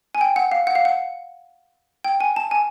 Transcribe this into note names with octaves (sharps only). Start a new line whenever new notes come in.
G#5
G5
F#5
F5
F#5
F5
F#5
G5
G#5
A5
G#5